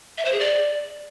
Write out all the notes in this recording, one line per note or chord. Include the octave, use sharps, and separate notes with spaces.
E5
C5
G#4
D5